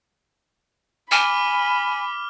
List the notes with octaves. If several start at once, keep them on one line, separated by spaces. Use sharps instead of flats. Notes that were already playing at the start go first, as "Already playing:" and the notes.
G#5 B5 D6 F6 G7